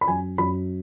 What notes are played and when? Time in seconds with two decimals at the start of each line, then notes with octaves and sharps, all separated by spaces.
0.01 B5
0.08 F#2 G#5
0.38 F#2 B5